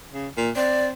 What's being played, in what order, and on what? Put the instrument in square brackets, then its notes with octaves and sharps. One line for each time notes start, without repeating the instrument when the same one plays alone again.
[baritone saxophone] C#3
A#2
[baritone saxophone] C4 [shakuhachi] D5